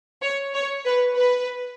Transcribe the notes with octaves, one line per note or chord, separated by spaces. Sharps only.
C#5
C#5
B4
B4